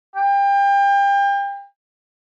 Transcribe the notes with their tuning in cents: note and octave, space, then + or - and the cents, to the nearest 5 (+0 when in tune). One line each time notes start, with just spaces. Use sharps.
G5 +30